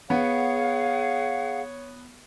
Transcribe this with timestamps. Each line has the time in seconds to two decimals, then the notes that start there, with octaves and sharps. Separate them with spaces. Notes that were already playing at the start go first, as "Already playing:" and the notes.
0.10 B3 G#4 C#5 F5 F#5